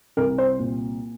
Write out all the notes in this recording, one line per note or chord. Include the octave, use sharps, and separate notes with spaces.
C2 A#4
C5
A#2